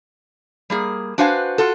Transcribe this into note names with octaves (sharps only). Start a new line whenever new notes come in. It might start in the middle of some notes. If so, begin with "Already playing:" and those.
G3 A#3 G#4
D4 F#4 B4 C5 F5 G#5
F4 F#4 A4